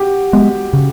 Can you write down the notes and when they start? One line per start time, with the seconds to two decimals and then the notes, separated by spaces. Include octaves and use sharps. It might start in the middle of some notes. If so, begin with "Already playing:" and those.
Already playing: F#4 G4
0.33 G#3 B3
0.73 C#3